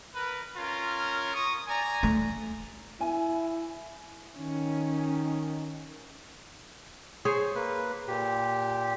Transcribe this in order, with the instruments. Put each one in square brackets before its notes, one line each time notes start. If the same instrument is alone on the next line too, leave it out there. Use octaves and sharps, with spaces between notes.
[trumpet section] A#4 B4
C#4 F4 A#4
C#6 D#6
D5 G#5 A#5
[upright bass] A3
[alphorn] E4 [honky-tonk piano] G#5
[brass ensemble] D#3 [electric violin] C#4
[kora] G#4 C5 C#5
[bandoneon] A#3 B4
A#2 G4